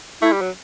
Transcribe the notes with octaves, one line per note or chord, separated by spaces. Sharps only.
A3 E4
G3
F#3